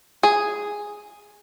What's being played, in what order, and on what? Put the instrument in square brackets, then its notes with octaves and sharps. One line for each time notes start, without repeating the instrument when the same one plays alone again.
[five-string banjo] G#4